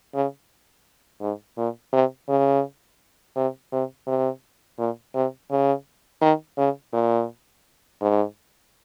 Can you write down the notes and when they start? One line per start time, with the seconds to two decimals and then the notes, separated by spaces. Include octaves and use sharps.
0.15 C#3
1.21 G#2
1.57 A#2
1.93 C3
2.29 C#3
3.36 C3
3.72 C3
4.07 C3
4.79 A#2
5.15 C3
5.51 C#3
6.21 D#3
6.58 C#3
6.93 A#2
8.01 G#2